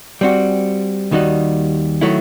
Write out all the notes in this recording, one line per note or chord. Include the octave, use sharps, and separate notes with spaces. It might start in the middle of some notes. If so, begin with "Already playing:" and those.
G3 C4 F#4
D#2 D#3 G3 D#4 F#4
D#3 F#3 A3 E4